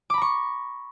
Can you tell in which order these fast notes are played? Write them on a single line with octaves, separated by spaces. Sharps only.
D6 B5 A#5 C#6